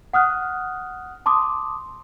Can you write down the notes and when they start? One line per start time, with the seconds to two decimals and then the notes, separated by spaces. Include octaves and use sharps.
0.13 F#5 D#6 F6 F#6
1.26 A5 C6 D6 D#6